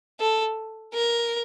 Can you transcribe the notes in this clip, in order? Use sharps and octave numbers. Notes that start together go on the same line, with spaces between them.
A4
A#4